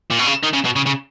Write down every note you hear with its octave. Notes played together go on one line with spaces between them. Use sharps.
A#2
B2
C#3
D#3
C#3
B2
C#3
C#3